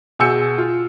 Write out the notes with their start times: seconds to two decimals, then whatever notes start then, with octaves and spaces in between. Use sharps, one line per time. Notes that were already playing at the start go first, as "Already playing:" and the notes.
0.19 B2 G#4 G#5 E6 G6 C#7
0.58 F4